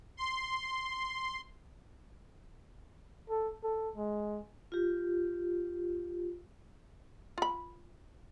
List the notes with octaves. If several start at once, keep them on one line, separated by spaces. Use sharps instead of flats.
C6
A4
A4
G#3
F4 G4
F4 B5